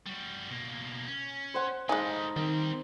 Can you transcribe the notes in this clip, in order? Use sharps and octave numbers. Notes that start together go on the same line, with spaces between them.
G3 F#4
B2 A#3
C#4
C5 F#5
G#3 D#4 A4 B4 F5 G#5
D#3 G3 C4